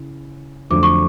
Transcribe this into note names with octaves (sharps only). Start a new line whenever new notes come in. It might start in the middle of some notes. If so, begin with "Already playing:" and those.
Already playing: C#3 E4
F2 D3 F#3 A3 D4 D6
C#6